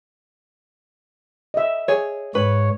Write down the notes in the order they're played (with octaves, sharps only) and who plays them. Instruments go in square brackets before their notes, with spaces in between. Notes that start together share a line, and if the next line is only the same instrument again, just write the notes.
[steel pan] D#5 E5
[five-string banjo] G#4 C#5
[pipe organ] G#2 C#5 [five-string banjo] B4